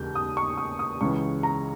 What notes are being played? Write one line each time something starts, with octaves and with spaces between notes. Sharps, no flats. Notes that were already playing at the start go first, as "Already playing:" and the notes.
Already playing: E1 D#2 C#3 E3 G6
D#6
C#6
D#6
D#6
C#2 C#3 E3 C#6
A#5